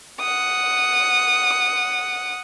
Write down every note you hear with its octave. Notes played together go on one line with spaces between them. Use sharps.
F#5 D#6